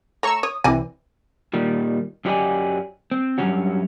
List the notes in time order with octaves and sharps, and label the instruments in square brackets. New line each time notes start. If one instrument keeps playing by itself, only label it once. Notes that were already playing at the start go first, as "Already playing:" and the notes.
[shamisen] A3 C#5 [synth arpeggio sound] A#5 C#6 E6
[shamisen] C#5 [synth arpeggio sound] D#6
[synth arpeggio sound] C2 E3 [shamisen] C4 D5 G#5
[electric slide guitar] A#2 D#3 G3
F#2 F#3 G4 D5 D#5 G#5
C4
G2 A#2 F#3 G3 C#4 F#4